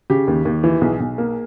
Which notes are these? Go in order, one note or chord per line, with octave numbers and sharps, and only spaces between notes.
C#3 G4
D#2
D#2
E3
B1 G#4
B1
A#3